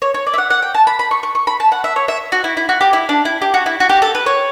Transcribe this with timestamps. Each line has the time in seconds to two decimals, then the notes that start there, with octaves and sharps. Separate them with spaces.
0.02 C#5
0.14 C#5
0.26 D5
0.33 E5
0.38 F#5
0.50 F#5
0.62 G5
0.74 A5
0.87 B5
0.99 B5
1.11 C#6
1.23 C#6
1.35 C#6
1.47 B5
1.60 A5
1.72 F#5
1.84 E5
1.96 C#5
2.08 E5
2.32 F#4
2.44 E4
2.57 E4
2.69 F#4
2.81 G4
2.93 E4
3.09 D4
3.25 E4
3.42 G4
3.54 F#4
3.66 E4
3.80 F#4
3.89 G4
4.02 A4
4.15 B4
4.26 C#5